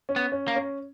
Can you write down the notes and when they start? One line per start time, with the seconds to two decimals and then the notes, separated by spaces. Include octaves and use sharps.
0.09 C#4
0.16 B3
0.32 C#4
0.48 A#3
0.56 C#4